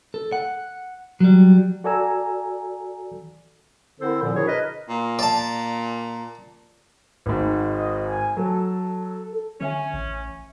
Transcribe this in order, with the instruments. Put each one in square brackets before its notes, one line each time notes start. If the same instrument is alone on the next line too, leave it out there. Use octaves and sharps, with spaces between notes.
[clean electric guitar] A4
F#5
F#3 G3
[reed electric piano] F#4 A4 D5 G#5 A#5 E6
[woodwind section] D3 C4 E4 A4 A#4 C5
A#2 D3 F3
D4 E4 F#4 G#4 A#4 C#5
A#4 B4 D#5
[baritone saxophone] A#2
[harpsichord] D5 A5
[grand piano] G#1 G#2
[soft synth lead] D#5
G#5
[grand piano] F#3 [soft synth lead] A4
[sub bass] D3 [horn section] C#4 [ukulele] C#5 E5 G#5
[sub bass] A1